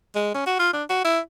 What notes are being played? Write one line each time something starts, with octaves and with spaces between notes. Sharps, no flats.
G#3
C#4
F#4
F4
D4
F#4
E4